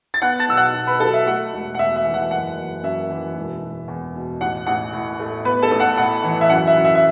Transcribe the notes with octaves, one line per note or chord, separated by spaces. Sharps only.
A6
B3 F#5 F#6
A5 A6
B1 E6
F#5 F#6
B2
B4 B5
F#3 A4 A5
E5
A3 F#5
E1
F#5
E2 E5
E5
E3
F#5
F#1 F#5
F#1
F#2 E5
E3
E1
E1
E2
B2
A1 F#5
A1 F#5
A2
A3
B3 B4 B5
A4 A5
A1
F#5
A2 F#5
E3
E5
F#2 F#5
E5
F#2
E5
E5